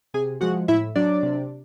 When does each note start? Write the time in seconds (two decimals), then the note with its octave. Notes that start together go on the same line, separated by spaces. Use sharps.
0.14 C3 G#4 G#5
0.41 F3 G#3 F#4 F#5
0.68 A2 E4 E5
0.96 F#3 D4 D5
1.23 C3